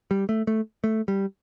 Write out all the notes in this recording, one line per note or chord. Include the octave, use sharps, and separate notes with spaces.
G3
A3
A3
A3
G3